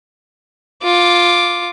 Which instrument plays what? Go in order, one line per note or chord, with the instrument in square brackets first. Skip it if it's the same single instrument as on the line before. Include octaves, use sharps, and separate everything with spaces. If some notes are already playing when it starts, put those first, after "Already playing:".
[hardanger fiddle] F4 D6